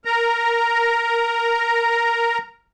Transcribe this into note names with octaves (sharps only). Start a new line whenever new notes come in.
A#4 A#5